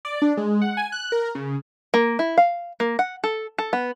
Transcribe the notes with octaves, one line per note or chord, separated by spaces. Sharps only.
D5
D4
G#3
F#5
G#5
F#6
A#4
C#3
A#3
E4
F5
A#3
F#5
A4
A4
B3